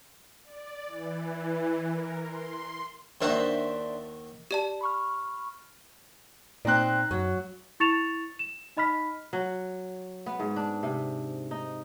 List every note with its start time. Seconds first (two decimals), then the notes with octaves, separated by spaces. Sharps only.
0.44 D5
0.87 E3
1.89 A#4
2.24 C6
3.21 D#2 D#3 D4 F#4 C5 E5
4.51 G4 D5 A5
4.81 B5 C#6 F6
6.65 A#2 C4 D#4 D5 A#5 F#6
7.11 F#2 F#3
7.80 E4 C#6 A6 C#7 E7 F7
8.39 E7
8.77 D#4 D#5 B5 F6 B6
9.33 F#3
10.26 B3
10.40 G#2
10.56 D4
10.83 C3
11.51 D#4